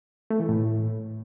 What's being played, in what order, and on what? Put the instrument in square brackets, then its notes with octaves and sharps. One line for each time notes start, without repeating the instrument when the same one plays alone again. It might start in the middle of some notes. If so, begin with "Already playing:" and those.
[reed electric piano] A3
E3
A2